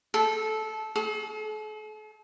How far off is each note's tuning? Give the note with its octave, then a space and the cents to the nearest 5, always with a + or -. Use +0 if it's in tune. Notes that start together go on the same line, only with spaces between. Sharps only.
A4 -15
A4 -45